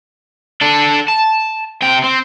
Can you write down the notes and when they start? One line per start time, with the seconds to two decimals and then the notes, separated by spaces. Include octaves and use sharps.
0.61 D4 A4
1.09 A5
1.82 C3 G5
2.04 C4